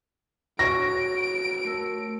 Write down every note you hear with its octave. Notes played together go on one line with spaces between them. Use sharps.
F#4 C#5 A#6 D7
A3 A#4 E6